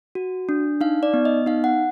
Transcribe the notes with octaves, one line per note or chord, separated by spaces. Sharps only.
F#4
D4
D#4 F5
D5
B3
D#5
D#4 F5
F#5